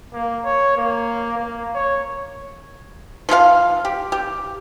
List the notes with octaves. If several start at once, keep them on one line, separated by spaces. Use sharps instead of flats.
A#3
C#5
A#3
A#3
C#5
F3 F4 G#4 F5
G4
G4